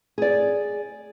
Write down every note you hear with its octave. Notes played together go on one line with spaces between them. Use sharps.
G#4 D5